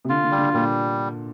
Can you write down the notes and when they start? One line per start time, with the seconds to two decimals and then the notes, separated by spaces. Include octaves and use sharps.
0.05 C3
0.09 D3 F4
0.24 D3
0.31 G3
0.38 D3
0.53 A#2 G3